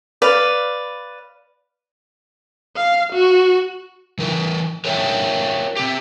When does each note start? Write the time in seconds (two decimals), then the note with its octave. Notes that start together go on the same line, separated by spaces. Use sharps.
0.22 B4 D5 F5
2.76 F5
3.13 F#4
4.18 E3 A#4 B4
4.85 A#4 C5 C#5 D#5 E5 G5
5.77 C4 G4